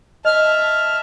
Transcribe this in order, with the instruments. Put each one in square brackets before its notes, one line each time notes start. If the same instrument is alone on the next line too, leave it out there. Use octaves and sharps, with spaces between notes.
[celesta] D#5 [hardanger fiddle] E5 A5 [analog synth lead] F6